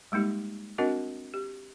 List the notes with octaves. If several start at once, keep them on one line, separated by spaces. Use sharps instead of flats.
G3 G#3 A#3 D#4 G4
C4 D4 F#4 A#4 D#5 F#5
G4